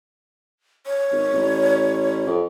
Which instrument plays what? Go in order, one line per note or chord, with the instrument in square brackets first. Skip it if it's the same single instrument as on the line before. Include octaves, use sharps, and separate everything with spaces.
[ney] C#5
[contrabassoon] G#1
A1
F2